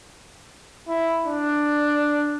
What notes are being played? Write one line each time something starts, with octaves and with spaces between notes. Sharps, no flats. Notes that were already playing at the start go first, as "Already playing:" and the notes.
E4
D4